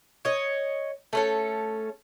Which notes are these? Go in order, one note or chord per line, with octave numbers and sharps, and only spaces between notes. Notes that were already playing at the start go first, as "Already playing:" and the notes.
C#5 D#5
A3 C#4 A4